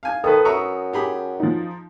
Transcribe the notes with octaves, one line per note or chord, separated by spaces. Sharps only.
F5 G#5
D#3 A4 B4 D#6
F#2 B4 E5 A#5 C#6
G4 G#4 B5
F3 D#4